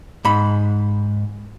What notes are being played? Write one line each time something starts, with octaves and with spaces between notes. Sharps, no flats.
G#2 B5